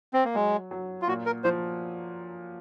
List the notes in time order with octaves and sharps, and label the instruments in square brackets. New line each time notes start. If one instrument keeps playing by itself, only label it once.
[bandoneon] C4
A#3
[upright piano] F#3 [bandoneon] G#3
[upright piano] F#3
[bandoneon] F4
[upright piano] A#2 [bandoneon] F#4
[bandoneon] A#4
[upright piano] F3 [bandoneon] C5